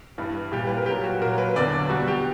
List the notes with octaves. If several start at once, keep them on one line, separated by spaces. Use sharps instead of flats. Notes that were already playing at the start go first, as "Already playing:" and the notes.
G2 E3 G3
A#2 G3 G4
B4
A#4
A#2 F#3 G4
F#4
A#2 F#3 A#4
B4
E2 D3 F#3 D5
B2 G3 F#4
G4